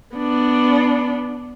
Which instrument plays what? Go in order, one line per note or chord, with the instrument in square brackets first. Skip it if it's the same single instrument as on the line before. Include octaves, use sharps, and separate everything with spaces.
[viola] B3 D4